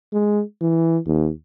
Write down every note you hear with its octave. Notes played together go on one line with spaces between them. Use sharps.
G#3
E3
D#2